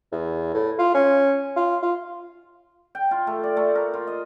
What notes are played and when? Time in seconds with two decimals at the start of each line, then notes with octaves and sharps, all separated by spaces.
0.12 E2
0.54 A2
0.79 F4
0.94 C#4
1.56 F4
1.83 F4
2.95 G5
3.11 F4
3.27 A3
3.44 D5
3.57 A3
3.75 A#4
3.94 F4
4.07 D#5